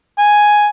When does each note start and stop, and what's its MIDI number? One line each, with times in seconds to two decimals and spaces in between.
0.18 0.68 80